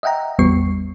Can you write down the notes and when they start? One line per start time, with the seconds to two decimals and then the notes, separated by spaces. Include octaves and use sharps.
0.03 D#5 E5 F#5 G5 A#5
0.39 A1 E2 G3 B3 C#6 C7